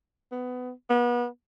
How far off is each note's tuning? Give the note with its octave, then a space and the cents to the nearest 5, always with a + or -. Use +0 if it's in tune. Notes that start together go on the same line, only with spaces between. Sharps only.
B3 +20
B3 -35